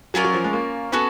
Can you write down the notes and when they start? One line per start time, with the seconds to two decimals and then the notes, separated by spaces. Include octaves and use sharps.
0.14 F#3 C#4 F4 A#4 D5
0.24 F#3
0.34 F3
0.44 G#3
0.53 A#3
0.92 B3 C#4 F#4 A4